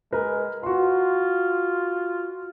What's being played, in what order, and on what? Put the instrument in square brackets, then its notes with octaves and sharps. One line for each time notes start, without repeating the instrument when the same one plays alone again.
[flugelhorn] G#3 [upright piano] A#4 B4
[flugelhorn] F4 [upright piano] F#4 C6